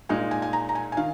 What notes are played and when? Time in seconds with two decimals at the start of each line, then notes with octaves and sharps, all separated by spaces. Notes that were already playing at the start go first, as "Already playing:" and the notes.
0.09 A#2 G#3 D#4 G#5
0.31 G#5
0.42 G#5
0.53 A#5
0.69 A#5
0.75 G#5
0.92 G#5
0.97 D#3 F5